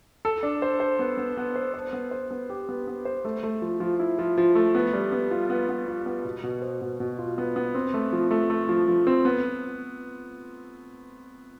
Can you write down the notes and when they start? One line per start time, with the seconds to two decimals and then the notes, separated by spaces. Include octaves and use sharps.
0.25 A4
0.43 D4
0.62 C5
0.80 C5
0.99 B3
1.17 B3
1.37 B3
1.56 C5
1.74 C5
1.93 B3
2.11 C5
2.31 B3
2.50 G4
2.69 B3
2.88 B3
3.05 C5
3.25 A3
3.43 A3
3.62 F3
3.80 F3
4.00 E4
4.19 F3
4.38 F3
4.55 A3
4.75 B3
4.93 G3
5.12 B3
5.31 F4
5.50 B3
5.69 B3
5.88 F4
6.06 B3
6.25 B2
6.43 B2
6.62 C5
6.81 B2
7.00 B2
7.19 F4
7.38 B3
7.56 B3
7.75 C4
7.94 A3
8.13 F3
8.31 A3
8.50 A3
8.69 F3
8.88 F3
9.07 C4
9.25 B3